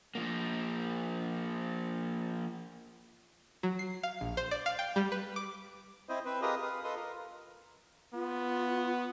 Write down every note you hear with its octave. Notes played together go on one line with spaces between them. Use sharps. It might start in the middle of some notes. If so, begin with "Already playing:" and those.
F3 A#3
F#3
C7
F5
A#1
C5
D5
F5
G5
G3
B4
D6
C4 E4 C5 D#5
C4 B4
F4 G4 G#4 A#4 B4 D#5
B4 F5 D#6
A4 B4 D#5 C6
F4 A#4
B3 F4